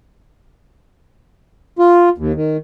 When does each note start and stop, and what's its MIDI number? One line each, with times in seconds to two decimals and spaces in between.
1.79 2.09 65
2.18 2.32 39
2.35 2.57 51